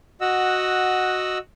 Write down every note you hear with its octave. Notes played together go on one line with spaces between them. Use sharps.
F#4 D#5 F#5 E6